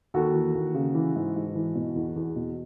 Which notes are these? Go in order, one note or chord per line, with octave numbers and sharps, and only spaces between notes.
D#2 F#4 A4
E3
D#2
C#3
E3
G#2
G#2
E3
B2
E2
E2
B2